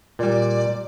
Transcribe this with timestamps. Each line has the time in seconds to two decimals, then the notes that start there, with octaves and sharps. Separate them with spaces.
0.19 A#2 G3 D5